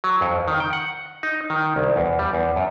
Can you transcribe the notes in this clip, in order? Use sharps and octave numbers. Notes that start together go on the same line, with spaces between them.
F#3
F2
D#3
G5
F#5
D#4
D#3
C2
E2
G3
E2
F#2